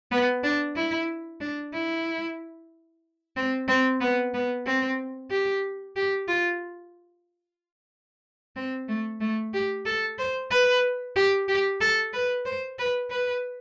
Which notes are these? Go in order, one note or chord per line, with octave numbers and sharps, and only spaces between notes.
B3
D4
E4
D4
E4
C4
C4
B3
B3
C4
G4
G4
F4
C4
A3
A3
G4
A4
C5
B4
G4
G4
A4
B4
C5
B4
B4